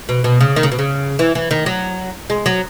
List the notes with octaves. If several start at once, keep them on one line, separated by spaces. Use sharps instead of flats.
B2
B2
C#3
D#3
C#3
B2
C#3
E3
E3
D#3
F#3
G#3
F#3